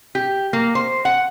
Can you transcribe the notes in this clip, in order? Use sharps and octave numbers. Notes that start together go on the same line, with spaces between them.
G4
A#3
C5
F#5